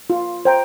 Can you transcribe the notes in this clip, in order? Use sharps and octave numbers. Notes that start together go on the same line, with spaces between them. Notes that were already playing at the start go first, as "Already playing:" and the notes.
F4
C5 G5 A#5